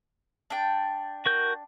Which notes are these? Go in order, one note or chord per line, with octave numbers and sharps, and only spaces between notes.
D4 G5
F#4 A#4 G6